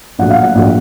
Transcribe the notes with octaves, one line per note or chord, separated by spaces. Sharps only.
A#1 A2 F#3 F#5
F5
F#5
A#1 A2 F#3